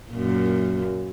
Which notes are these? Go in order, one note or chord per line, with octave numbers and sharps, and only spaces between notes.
F#2 A#2